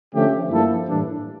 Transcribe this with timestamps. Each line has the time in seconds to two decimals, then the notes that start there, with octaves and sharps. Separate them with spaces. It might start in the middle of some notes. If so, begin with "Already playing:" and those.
0.14 D3 F3 A3 C#4 G4
0.51 G2 F3 A#3 E4 A4
0.87 A2 E3 G3 D4